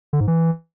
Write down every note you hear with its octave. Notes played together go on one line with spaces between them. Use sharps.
D3
G#2
E3